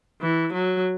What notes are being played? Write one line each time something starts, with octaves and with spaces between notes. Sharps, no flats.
E3
F#3